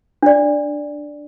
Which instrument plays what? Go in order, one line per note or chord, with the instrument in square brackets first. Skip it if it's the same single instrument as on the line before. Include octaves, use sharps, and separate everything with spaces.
[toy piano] D4 D5